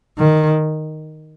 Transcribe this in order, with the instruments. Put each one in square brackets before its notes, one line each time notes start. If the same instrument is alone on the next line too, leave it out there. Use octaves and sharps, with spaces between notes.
[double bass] D#3